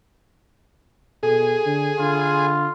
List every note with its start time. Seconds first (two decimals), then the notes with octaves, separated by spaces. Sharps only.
1.23 B2 G#4 A4
1.66 D3
1.99 D3 F4